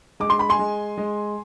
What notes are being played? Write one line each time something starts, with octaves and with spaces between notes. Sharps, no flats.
G#3 D6
C6
B5
G#5 C6
G#3
G#3